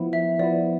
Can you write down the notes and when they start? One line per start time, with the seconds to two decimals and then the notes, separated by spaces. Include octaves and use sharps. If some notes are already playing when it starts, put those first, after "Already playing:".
Already playing: F3 B3 E4
0.13 E5
0.39 F3 B3 E4 D5